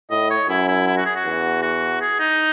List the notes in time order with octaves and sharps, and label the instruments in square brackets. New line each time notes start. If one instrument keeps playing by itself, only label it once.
[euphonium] A2 [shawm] D#5
[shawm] C#5
[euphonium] F#2 [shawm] E4
[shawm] E4
E4
F#4
G#4
F#4
[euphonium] E2
[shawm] F#4
G#4
D#4